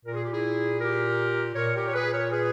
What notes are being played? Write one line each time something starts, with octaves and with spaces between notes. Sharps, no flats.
A#2 A#4
G#4
G4
E4 G#4
G4 A#4
A#2 A#4 C#5
G4 A#4
C#5
G#4 B4
A#4 C#5
G#4 B4